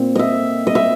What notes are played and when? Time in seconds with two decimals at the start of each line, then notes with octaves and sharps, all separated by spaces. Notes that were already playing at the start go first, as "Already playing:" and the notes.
Already playing: A#2 C4
0.15 D#5 E5
0.67 D#5
0.75 E5